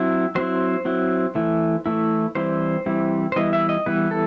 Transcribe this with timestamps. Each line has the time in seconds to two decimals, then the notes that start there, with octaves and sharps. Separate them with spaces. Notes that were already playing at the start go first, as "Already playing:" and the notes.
Already playing: F#3 C4 E4 E5
0.35 F#3 C4 E4 C5
0.85 F#3 C4 E4
1.35 E3 A3 E4
1.86 E3 A3 E4
2.35 E3 G3 C4 E4 C5
2.86 E3 G3 C4 E4
3.32 C5
3.36 E3 G3 B3 E4 D#5
3.53 E5
3.69 D#5
3.86 E3 G3 B3 E4 B4
4.11 A4